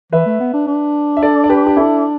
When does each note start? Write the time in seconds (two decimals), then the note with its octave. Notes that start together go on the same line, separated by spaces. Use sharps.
0.12 E3 B4 E5
0.26 A3
0.40 B3
0.54 D4
0.67 D4
1.17 E5
1.23 A4 D5
1.44 D5
1.50 G4 B4
1.67 G4
1.77 E4 A4